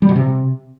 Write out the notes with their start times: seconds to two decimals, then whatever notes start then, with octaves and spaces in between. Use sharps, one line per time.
0.02 G3
0.09 B2
0.16 C3